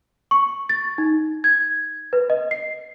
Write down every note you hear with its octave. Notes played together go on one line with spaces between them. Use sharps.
C#6
A6
D#4
G#6
B4
D#5
C7